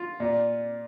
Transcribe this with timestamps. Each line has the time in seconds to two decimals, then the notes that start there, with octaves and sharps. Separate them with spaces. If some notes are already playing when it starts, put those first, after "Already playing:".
Already playing: F4
0.20 A#2 D5